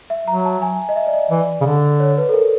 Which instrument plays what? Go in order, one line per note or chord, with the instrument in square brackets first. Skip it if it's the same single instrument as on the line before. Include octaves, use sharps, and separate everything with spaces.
[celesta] E5
[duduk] F#3 [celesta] A#5
[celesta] A5
G#5
D#5
E5
D5
D#5
[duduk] E3 [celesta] D5
[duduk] C#3
D3
[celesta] C#5
B4
A4
A#4